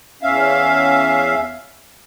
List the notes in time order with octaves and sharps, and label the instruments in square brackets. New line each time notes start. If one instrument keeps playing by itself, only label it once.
[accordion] E2 C#4 E5 F5